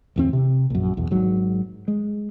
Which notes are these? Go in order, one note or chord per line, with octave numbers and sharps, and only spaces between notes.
D1 E2 C4
C3
A#1 F#2
B1 E2
G#1 G#2 F#3
G#3